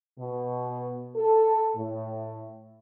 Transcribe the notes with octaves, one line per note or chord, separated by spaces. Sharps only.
B2
A4
A2